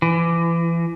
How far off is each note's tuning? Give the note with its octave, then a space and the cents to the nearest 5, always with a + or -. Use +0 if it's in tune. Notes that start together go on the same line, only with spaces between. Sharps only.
E3 +30